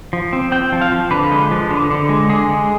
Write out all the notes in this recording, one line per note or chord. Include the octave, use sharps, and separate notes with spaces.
F3
C4
C4 G5
F3
F5
F3
D3 B4
G#3
F3
D3
D3
G#3
D3 G#4
G#3